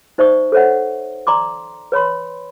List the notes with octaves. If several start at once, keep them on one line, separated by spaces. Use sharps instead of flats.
D#4 C5 D5 E5 C#6 D#6
A4 C5 C#5 E5 F#5
D5 A#5 C6 D6
B4 C#5 B5 C6